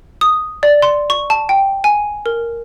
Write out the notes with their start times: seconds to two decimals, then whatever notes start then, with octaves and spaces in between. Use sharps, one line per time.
0.21 D#6
0.63 D5
0.82 C6
1.10 C#6
1.30 A5
1.49 G5
1.84 G#5
2.26 A#4